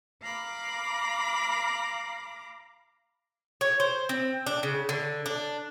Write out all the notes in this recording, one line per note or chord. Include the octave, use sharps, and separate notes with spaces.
F5 A#5 B5 D6
C#5
C5
C4
D4
C#3
D3
D4